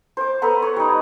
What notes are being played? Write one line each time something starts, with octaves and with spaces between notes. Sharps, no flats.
C5 D6
B3 A4 B4 A#5
C#5
G3 D#4